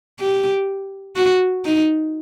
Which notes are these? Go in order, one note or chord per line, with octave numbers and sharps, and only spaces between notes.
G4
F#4
D#4